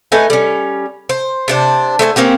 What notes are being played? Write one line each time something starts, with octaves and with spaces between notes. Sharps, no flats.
A3 D#4 B4 G#5
G3 C#4
C5
C3 D4 C5
A3 C5 D5 G#5
A#3 C4 C#4 G4